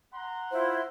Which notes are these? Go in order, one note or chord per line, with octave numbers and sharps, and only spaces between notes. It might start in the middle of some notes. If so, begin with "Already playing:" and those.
F#5 A#5 C6
E4 F4 C5